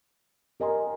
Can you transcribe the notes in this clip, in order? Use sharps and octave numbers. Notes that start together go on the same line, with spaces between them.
G4 A#4 D#5 G#5 C6